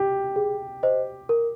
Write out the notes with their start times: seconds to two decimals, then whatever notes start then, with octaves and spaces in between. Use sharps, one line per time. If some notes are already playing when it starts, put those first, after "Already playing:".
Already playing: G4
0.36 G#4
0.83 C5 D#5
1.29 A#4